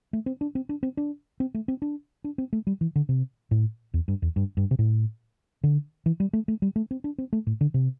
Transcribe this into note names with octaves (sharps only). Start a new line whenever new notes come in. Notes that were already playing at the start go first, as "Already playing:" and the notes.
A3
C4
D4
C4
D4
C4
D4
C4
A3
C4
D4
D4
C4
A3
G3
E3
D3
C3
A2
E2
G2
E2
G2
G2
C3
A2
D3
E3
G3
A3
A3
G3
A3
C4
D4
C4
A3
A2
D3
C3